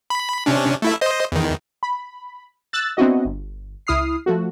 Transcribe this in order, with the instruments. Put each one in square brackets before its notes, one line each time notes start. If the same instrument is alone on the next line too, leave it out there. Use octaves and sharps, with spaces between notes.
[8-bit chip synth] B5
C3 C#4 D4
A3 E4 E5
C5 D#5
E2 D#3
[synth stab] B5
E6 F#6 A6
B3 C4 D4 E4 F#4 D#5
G1
C#2 E4 D#6 F6 C7
F3 A3 F#4